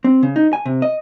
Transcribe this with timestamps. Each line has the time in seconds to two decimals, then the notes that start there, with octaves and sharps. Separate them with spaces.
0.04 C4
0.23 C#3
0.36 D#4
0.53 G#5
0.66 C3
0.82 D#5